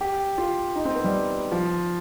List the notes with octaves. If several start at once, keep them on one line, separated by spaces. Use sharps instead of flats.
G4
F4
D#4
C4
B3
G3
F3